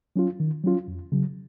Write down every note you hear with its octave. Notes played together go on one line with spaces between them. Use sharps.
F#3 C#4 F4
D#3
F#3 C#4 F4
F2
C#3 F#3